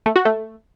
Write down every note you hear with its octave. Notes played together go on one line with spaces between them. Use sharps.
A3
F#4
A3